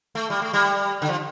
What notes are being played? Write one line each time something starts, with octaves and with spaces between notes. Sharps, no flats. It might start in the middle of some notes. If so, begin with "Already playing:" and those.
A3
G3
A3
G3
D3
F3